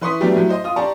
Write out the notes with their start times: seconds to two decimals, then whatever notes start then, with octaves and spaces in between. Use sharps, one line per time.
0.01 E3 B4 C6 C#6 D#6 B6
0.20 F#3 G3 A3 B3 D4 G4
0.36 A2 F#3
0.49 C5 D#5
0.64 F4 D#6
0.76 G4 D5 A5 A#5 C6 C#6